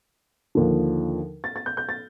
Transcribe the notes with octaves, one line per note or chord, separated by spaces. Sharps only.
D#2 D3 F3
A6
A6
G6
G6
A6